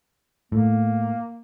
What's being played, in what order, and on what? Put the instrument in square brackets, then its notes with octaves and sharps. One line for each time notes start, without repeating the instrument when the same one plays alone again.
[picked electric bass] A2 [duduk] A#3